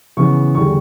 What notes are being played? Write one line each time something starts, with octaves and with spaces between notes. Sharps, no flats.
C#3 E3 B3 C#6
E2 D3 G3 C#6